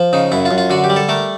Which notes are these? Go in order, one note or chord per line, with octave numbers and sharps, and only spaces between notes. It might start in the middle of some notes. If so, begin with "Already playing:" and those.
Already playing: F3
C#3 D#4
F#2 E4
F4
F#2
F4
D3 F#4
G4
G3
A4
A3 A#4